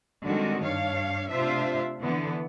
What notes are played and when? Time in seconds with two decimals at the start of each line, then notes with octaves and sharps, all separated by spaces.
0.23 D3 D#3 G3 G#3 C4 F#4
0.63 G2 D4 C#5 F5
1.30 C3 A3 D4 F4 C5 E5
2.01 D3 E3 B3